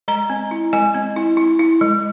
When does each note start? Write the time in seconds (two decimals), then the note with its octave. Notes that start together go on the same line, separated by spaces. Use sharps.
0.08 G#3 A#5
0.30 C4
0.51 E4
0.73 G#3 G#5
0.94 C4
1.16 E4
1.37 E4
1.59 E4
1.81 G#3